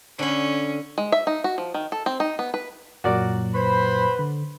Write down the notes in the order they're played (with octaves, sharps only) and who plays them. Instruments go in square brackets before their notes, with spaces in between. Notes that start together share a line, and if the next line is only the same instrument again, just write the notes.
[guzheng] D3 B5 [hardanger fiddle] C#4
[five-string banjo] G#3
E5
D#4
F#4
F3
D#3
A4
C4
D#4
B3
B4
[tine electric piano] F#2 A#2 F#3 [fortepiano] F#4 A#4 D5
[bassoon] B4 [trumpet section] C5 B5
[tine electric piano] D3